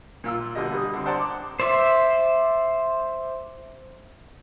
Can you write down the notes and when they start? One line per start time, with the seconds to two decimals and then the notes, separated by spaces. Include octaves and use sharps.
0.24 A#2 F4 E6
0.55 B2 D3 G3 D#5
0.74 G3 D#6
0.94 D3 C4
1.05 C5 D5 F#5 A5 A#5 C6
1.20 D6
1.60 C5 D5 E5